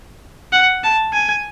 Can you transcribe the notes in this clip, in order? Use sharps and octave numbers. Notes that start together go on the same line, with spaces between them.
F#5
A5
G#5